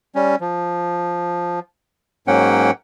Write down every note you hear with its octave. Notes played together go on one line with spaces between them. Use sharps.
G3 C#4
F3
G#2 F#3 A#3 C#4 F#5 G5